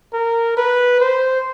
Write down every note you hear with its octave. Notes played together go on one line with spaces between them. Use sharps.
A#4
B4
C5